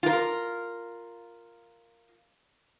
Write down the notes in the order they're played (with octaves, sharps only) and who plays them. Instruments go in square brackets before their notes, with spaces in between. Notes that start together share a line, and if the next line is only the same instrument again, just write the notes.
[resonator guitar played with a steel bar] F4 A#4